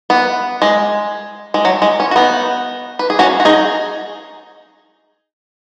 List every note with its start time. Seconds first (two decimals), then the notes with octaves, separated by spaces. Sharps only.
0.10 B3
0.62 G#3
1.54 G#3
1.65 F#3
1.82 G#3
2.00 C#4
2.11 F#4
2.16 B3 D#4
2.99 B4
3.10 G#4
3.19 C#4 F#4
3.40 F#4
3.45 D#4 G#4